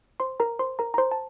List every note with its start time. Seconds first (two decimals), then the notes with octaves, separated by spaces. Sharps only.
0.20 C5 C6
0.40 A#4 A#5
0.59 C5 C6
0.79 A#4 A#5
0.94 A#5
0.98 C5 C6
1.11 A5